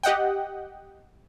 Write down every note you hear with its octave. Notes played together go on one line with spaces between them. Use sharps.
G4 D#5 F#5 G5